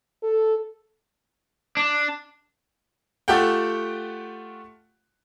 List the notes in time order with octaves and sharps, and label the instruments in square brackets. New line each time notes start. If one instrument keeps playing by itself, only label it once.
[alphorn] A4
[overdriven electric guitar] D4
[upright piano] A3 F4 G4 A4 F#5 G5